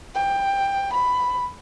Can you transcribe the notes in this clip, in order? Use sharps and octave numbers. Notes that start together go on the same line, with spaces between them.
G5
B5